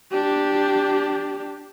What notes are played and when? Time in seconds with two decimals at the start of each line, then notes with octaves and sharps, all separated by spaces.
0.11 D4 G4